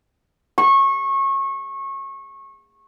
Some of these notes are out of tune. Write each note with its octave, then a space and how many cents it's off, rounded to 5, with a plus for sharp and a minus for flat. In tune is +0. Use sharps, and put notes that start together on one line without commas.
C#6 -25